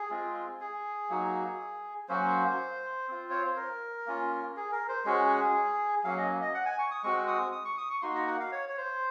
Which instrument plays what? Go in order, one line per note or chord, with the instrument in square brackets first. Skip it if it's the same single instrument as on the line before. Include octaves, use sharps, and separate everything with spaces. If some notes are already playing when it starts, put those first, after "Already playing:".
Already playing: [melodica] G#4
G#3 C4 F4
G#4
F#3 A#3 D#4 F#4
F#3 A#3 C#4 F#4 C5
C4 F4
C#5
C5
A#4
A#3 C#4 F4
G#4
A#4
C5
G#3 C#4 F#4 G#4
F#3 A#3 C#4 F5
D#5
D#5
F#5
G#5
C#6
D#6
G#3 C4 F#4 C#6
D#6
D#6
C#6
D#6
C#6
A#3 D#4 F#4 C6
A#5
F#5
F5
C#5
C#5
C5